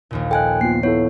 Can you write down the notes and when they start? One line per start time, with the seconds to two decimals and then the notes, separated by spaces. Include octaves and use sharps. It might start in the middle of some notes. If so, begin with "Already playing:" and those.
0.11 A#1 D#2 A#2
0.31 A4 D#5 G5 G#5 F#6
0.61 A#3 B3 F4 C7
0.83 B3 E4 A4 C#5